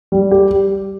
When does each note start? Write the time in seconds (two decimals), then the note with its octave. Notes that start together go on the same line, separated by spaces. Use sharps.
0.12 G3
0.31 G4